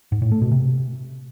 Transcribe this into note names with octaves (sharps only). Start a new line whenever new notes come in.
G#2
A2
A3
B2
C3